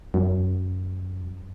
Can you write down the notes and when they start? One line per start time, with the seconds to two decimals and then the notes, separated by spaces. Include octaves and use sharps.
0.14 F#2